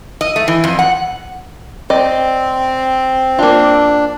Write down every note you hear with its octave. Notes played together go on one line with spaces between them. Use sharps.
D#5
A3
E3
F2
F#5
C4 D5 D#5
A#3 D4 F4